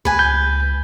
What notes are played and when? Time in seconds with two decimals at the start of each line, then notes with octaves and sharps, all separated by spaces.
0.05 C#2 B4 G#5
0.19 G6